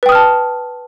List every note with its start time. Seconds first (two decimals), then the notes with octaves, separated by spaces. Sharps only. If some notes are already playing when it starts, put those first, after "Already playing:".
0.03 B4
0.06 G5
0.09 D#6
0.12 F6
0.15 A5